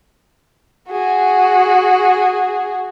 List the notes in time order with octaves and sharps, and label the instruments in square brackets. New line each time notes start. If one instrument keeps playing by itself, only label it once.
[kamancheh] F#4 G#4